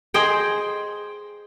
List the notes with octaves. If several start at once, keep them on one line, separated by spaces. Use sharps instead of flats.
G#4 C5 D#5 G5